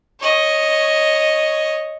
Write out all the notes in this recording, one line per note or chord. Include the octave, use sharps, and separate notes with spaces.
C#5 D#5